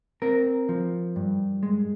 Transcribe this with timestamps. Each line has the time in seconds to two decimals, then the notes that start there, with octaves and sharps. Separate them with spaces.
0.22 C4 A#4
0.69 F3
1.16 G2
1.63 G#3